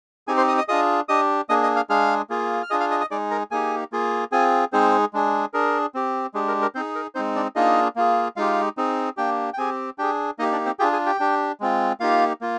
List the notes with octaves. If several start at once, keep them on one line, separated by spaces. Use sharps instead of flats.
C4 D#4 G4 G#4 G#5
C5 C6
D#5 D#6
D#5 D#6
D4 F4 G#4 D#5 D#6
D4 G4 D#5 D#6
A#3 D4 G#4 D#5 D#6
D#5 D#6
F5 F6
G#3 D4 G#4 F5 F6
A#3 F4 G#4
F6
D4 F4 G#4 D#5 D#6
F5 F6
D#5 D#6
D#5 D#6
G#3 D#4 G#4 D5 D6
A#4 A#5
A#3 D#4 G4 G#4 G#5
A#3 F4 G#4
C4 F4 G#4 G#5
G#3 C4 D#4 G#4 C5
G#3 D4 G#4
D4 G#4 A#4
C4 G4
G#3 D4 G4 G#4
A#4
A#4
C4 D#4 G#4 C5
A#4
G#3 C4 D#4 C5
D4 D5
A#3 D4 D#4 F4 G#4 D#5
A#3 F4 G#4
G#3 D#4 F4 G4 F5
C4 D#4 G#4
A#3 D4 G4 G5
G5
C4 G4 G#4 G#5
D4 G4 G#4 G5
A#3 D#4 G4 D#5
D4 D5
C4 C5
D4 F4 G4 G#4 G5
G#4 G#5
G4 G5
D4 G4
G#3 C4 F4
A#3 D#4 F4 G4 F5
A#3 F4